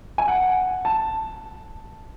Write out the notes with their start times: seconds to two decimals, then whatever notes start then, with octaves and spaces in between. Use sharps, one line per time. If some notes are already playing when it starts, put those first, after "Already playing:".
0.18 G#5
0.28 F#5
0.85 A5